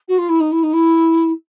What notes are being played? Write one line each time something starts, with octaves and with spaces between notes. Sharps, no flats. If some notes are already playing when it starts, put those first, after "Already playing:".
F#4
F4
E4
D#4
E4
D#4
E4